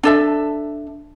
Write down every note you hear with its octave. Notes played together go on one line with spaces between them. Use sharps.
D4 A4 E5